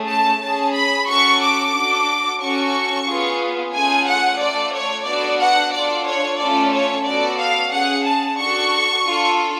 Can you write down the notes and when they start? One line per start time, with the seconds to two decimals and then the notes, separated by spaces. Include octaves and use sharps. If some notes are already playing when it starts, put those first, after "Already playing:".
Already playing: A3 C#4 G#4
0.08 A5
0.41 C#4 G#4 A5
0.74 B5
1.07 C#4 F#4 A4 C#6
1.41 D6
1.73 D4 F#4 A4
2.40 C#4 F#4 A4 C#6
3.06 B3 F4 G#4
3.72 A3 C#4 F4 G#4 G#5
4.06 F#5
4.39 A3 F4 A4 D5
4.72 C#5
5.05 B3 D4 F#4 A4 D5
5.39 F#5
5.72 D4 F4 A4 D5
6.05 C#5
6.38 A3 C#4 F4 A4 D5
6.71 C#5
7.04 B3 F#4 A4 D5
7.37 F5
7.70 C#4 G#4 F#5
8.04 A5
8.36 D4 F#4 A4 C#6
9.04 D4 F4 A4